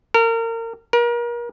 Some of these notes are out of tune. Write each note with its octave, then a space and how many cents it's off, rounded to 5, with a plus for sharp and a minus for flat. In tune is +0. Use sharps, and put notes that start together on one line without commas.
A#4 -30
A#4 +35